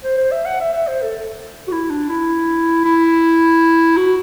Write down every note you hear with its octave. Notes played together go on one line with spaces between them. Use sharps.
C5
C5
E5
F#5
E5
E5
C5
A4
F#4
E4
D4
E4
E4
F#4